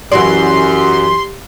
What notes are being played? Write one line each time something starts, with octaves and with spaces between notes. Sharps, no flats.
F#2 E3 F#4 G4 D5 C6